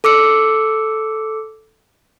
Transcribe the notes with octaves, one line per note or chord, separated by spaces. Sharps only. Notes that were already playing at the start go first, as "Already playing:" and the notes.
A4 D6 E6 C#7